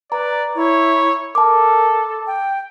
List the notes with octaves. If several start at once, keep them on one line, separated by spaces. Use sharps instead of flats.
B4 D5 A#5
E4 C#5
A4 A#4 A5 D6
G5